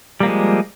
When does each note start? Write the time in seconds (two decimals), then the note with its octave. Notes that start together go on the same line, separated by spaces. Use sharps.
0.20 G3
0.23 A#3
0.26 F3
0.28 G#3